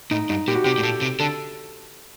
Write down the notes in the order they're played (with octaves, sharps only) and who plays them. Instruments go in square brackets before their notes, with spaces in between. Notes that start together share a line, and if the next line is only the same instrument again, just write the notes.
[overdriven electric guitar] A2 [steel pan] D#4
[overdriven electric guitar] G2 [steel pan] D#4
[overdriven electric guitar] A#2 [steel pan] G4
[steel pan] F#4
[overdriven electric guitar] C3 [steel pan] G4
[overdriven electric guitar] A2
[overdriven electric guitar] A#2 [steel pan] A4
[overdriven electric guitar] C3
[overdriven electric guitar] D3 [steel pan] A4